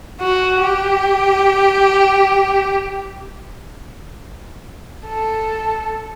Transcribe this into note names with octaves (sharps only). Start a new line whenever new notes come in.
F#4
G4
A4